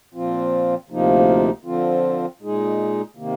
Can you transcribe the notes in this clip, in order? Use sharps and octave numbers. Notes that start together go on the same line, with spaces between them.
A#2 F3 C4 F4
D2 C3 F3 A#3 D#4
D3 F3 C4 F4
A#2 G#3 D#4 G#4
C3 D#3 A#3